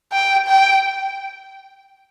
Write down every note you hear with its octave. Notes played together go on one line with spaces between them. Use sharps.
G5
G5